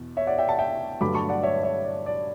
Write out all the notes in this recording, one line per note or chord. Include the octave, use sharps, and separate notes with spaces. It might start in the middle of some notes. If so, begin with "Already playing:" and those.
Already playing: E2 B2
C#5 E5
D5 F#5
E5 G5
F#5 A5
E5 G5
G2 D3 F#3 A3 B5 D6
A5 C#6
D5 F#5
C#5 E5
C#5 E5
D5
D5